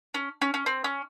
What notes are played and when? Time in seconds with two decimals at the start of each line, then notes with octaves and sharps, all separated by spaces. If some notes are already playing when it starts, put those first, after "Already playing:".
0.14 C#4
0.42 C#4
0.54 C#4
0.66 C4
0.84 C#4